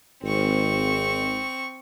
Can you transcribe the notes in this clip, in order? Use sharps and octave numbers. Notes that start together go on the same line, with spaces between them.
G#1 C4 C#6